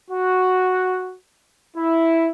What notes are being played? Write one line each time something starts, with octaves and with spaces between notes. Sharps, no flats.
F#4
E4